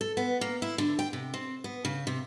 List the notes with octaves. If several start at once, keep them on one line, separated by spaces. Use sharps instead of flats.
A4
B3
A#3
E4
D3
G5
C3
C4
B3
C#3
C3